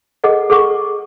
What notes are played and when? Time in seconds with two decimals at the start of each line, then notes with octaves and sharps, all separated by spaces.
0.24 G#4 A4 D#5 F#5
0.50 G#4 A4 F#5 C#6 D6